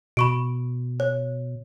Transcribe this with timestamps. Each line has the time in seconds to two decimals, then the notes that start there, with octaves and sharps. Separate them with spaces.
0.17 B2 B5 C#6 D7
1.00 C#5